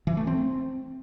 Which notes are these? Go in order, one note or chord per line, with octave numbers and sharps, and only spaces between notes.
E3
A3
C4